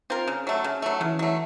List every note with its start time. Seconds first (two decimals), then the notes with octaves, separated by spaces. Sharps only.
0.10 C4 F4 A#4
0.27 C#3
0.47 F#3 A3
0.64 C#3
0.82 F#3 A3
1.01 C#3 E3
1.19 F#3 A3